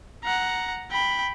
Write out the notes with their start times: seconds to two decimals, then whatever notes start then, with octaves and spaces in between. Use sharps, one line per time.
0.24 F#5 A#5
0.92 G5 B5